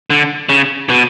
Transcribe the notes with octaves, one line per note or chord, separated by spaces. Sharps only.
D3
C#3
B2